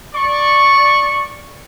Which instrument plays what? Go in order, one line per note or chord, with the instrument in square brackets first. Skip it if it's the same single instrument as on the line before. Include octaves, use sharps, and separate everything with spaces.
[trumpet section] D5 C#6